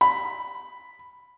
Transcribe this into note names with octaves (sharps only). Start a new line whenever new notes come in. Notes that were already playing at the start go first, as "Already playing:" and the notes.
B5